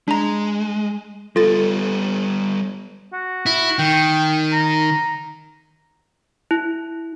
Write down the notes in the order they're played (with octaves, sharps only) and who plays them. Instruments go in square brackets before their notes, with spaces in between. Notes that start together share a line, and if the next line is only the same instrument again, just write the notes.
[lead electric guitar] G#3 [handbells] D4 A#5
[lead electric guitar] G3 B3 [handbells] F4 A6 [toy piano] A4
[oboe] F#4
[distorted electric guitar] E4
[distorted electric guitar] D#3 [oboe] G5
[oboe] A#5
[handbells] E4